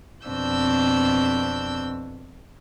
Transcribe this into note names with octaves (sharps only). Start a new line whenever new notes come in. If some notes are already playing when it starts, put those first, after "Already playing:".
F2 B2 C4 D4 E6 G6